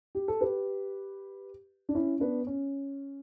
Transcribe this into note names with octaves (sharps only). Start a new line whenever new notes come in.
G4
A4
G4 B4
D4
C#4 E4
B3 D4
C#4